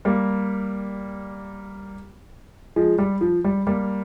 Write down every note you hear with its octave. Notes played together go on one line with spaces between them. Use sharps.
G3 A#3
F3 G#3
G3
F3
G3
G3 A#3